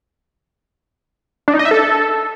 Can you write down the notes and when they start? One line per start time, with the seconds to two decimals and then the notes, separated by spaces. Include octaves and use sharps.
1.48 D4
1.54 D#4
1.59 D#5
1.65 E5
1.71 A4